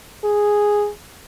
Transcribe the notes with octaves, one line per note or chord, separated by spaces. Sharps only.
G#4